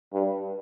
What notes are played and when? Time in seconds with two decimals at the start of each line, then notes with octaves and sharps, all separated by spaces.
0.13 G2